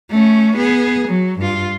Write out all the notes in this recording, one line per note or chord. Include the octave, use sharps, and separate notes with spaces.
A3 C#4
B3 G#4
F#3
G2 F4